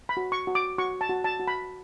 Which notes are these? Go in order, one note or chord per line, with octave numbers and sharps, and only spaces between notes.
B5
F#4
C#6
F#4
D6
F#4 C#6
A5
F#4
A5
F#4
B5